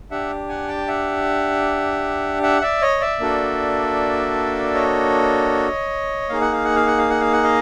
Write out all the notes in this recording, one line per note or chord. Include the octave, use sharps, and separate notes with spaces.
D4 G4 E5 F#5
F#5 G#5
G5 A5
E5 F#5
E5 F#5
D5 E5
C#5 D#5
D5 E5
A#3 D4 F#4 A4
C#5 D#5
A#3 D#4 G#4 F5
F#5
F5
F#5
F5
F#5
F5
F#5
F5
F#5
D#5 F5